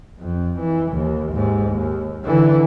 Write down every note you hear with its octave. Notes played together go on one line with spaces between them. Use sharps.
F2
E3
D#2
D#2 G#2
D#2
D3 E3